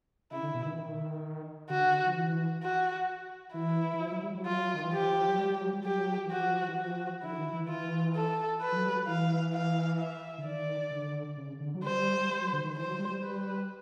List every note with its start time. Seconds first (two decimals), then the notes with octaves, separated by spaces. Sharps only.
0.31 C#3 E4
0.43 D3
0.54 B2
0.66 D#3
0.72 E3
0.78 D#3
1.70 D3 F#4
2.06 F3
2.15 E3
2.62 F#4
3.54 E3 E4
3.94 E3
4.00 F3
4.11 F#3
4.23 G3
4.35 F#3
4.46 F4
4.74 D#3
4.83 E3
4.92 F3 G4
5.28 F#3
5.38 G3
5.50 G3
5.61 F#3
5.73 G3
5.84 F#3 G4
6.26 E3
6.30 F3 F#4
6.68 E3
6.77 F3 F#4
7.23 D3 E4
7.38 D#3
7.53 E3
7.69 F4
8.15 A4
8.61 B4
8.72 F3
8.76 F#3
8.87 G3
8.92 F#3
9.07 E3 F5
9.53 F5
9.99 E5
10.38 D3
10.45 D#3 D5
10.91 D3
11.37 C#3
11.60 D3
11.75 F#3
11.84 G3 C5
12.29 G3
12.41 F#3
12.53 D3
12.64 D#3
12.76 E3 C5
12.87 F#3
12.99 G3
13.10 G3
13.22 G3 B4